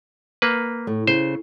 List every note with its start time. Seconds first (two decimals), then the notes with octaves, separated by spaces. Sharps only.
0.42 A#3 B4
0.87 A2
1.07 C#3 C5